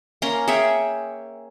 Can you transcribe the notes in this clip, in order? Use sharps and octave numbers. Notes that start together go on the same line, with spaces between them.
A#3 C#4 A#5 C6
G#4 C#5 E5 G5